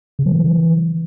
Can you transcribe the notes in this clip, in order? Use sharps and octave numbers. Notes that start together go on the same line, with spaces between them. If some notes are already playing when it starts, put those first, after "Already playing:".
C#3
F#3
E3